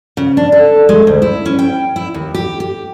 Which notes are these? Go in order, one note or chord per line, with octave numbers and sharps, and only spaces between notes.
C#3
D4
A4
G#3
D2
E4
C#4
G5
E4
D#2
G4
G4